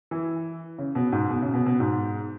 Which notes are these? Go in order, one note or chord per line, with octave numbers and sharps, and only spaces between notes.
E3
C#3
B2
G#2
B2
C#3
B2
B2
G#2